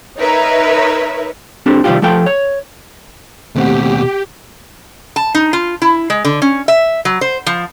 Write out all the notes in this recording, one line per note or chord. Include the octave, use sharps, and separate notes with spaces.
D#4 A#4 B4 C#5 E5
C4 D4 G4 A4
C3 D#3 F3 G3 F4 G4
F3 A3 A4 G5
C#5
D#2 B2 A3 C4 G4 F#5
A5
D#4
F4
E4
G#3
D3
C#4
E5
F#3
C5
F3